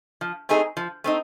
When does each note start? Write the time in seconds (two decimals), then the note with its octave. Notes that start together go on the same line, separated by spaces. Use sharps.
0.21 F3
0.49 A3 C4 D#4 G#4
0.77 F3
1.04 A3 C4 D#4